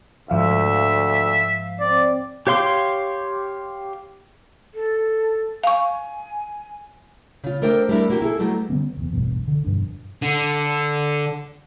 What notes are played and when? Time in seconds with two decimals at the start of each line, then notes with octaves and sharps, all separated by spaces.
0.30 D2 G#2 F3 E5 F5
1.80 C4 D5
2.47 G4 C#5 F5 C6 D6
4.74 A4
5.63 F5 G#5 C#6
7.44 C#3 F4
7.62 A3 D4 A#4 C5 G5
7.89 G3 A3 D4 E4 A#4
8.10 A#3 F#4 G4
8.22 E4 G#4 A4
8.40 F#3 G3 A3 B3
8.69 D3 G3 B3 C#4
8.97 F1 E2
9.13 E1 A1 G2 B2
9.48 D3
9.64 E1 G2 D4
10.22 D3